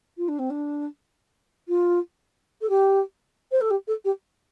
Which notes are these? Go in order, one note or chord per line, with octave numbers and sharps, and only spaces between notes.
F4
D4
C4
D4
F4
A4
G4
C5
A4
G4
A4
G4